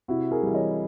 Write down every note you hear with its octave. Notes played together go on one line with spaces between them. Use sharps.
C3 E4 F#4
G#4 A#4
E3 G3
C#5 D#5